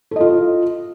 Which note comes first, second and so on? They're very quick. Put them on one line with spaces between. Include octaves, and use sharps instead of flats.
A4 D#5 F4